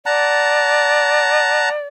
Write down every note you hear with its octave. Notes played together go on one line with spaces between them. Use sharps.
D5 F#5 A5 A#5